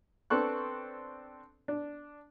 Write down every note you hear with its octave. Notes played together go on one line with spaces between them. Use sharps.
B3 C4 D4 A4 C#6 F#6
D4